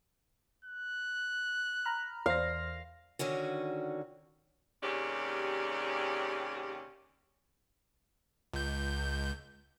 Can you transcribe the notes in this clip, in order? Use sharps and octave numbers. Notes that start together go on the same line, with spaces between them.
F#6
A#5 B5 F6
E2 C5 F5 A#6
D3 D#3 C#4 F#4
D#2 C3 C#4 G4 G#4 D5
C#2 G6